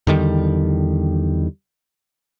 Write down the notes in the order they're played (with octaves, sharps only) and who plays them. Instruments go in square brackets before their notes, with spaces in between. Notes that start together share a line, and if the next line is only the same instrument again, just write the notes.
[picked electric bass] E2 D3 D#3 G3